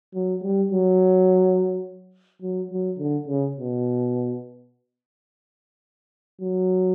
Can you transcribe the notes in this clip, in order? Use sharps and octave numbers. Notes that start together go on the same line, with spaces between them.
F#3
G3
F#3
F#3
F#3
D3
C#3
B2
F#3